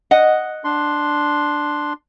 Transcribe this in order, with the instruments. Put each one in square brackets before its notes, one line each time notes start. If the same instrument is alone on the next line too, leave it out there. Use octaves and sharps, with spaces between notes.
[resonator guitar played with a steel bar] D#5 F#5
[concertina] D4 C6